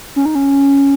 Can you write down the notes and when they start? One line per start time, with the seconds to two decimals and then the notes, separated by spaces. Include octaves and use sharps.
0.16 C#4
0.25 D#4
0.35 C#4